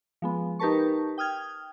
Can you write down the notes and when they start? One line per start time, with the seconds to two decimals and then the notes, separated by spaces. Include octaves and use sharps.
0.22 F3 G#3 B3
0.59 D#4 G4 A#4 B4 A5 C#6
1.18 G5 D#6 F6 G#6